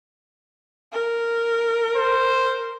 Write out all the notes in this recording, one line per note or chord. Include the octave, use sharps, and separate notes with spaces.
A#4
C5